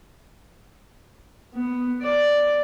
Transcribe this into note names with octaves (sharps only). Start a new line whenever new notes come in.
B3
D5